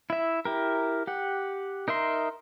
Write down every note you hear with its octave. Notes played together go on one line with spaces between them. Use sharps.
E4 E5
E4 G4 A#4
G4 F#5
D#4 A#4 E5 C6